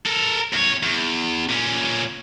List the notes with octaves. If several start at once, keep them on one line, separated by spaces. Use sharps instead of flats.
A4 A#4
E2 C#5
E2
A#2 C#4